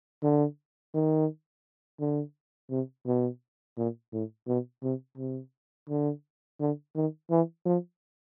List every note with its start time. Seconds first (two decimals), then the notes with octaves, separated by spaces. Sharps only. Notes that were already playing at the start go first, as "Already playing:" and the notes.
0.23 D3
0.94 D#3
2.00 D3
2.70 C3
3.06 B2
3.77 A#2
4.12 A2
4.47 B2
4.83 C3
5.18 C3
5.89 D3
6.60 D3
6.96 D#3
7.30 E3
7.66 F3